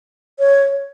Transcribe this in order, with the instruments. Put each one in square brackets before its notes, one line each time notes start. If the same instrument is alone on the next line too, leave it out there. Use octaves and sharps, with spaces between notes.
[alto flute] C#5